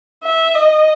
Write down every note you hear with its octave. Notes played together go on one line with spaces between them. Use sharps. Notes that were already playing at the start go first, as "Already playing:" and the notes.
E5
D#5